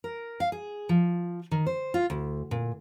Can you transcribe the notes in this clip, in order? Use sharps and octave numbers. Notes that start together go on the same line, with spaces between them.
A#4
F5
G#4
F3
D#3
C5
F4
D2
A#2